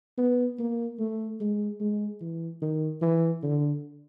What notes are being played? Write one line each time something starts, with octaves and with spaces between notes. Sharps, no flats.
B3
A#3
A3
G#3
G#3
E3
D#3
E3
D3